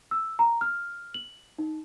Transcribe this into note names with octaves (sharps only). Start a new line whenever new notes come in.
E6
A#5
F6
F#7
D#4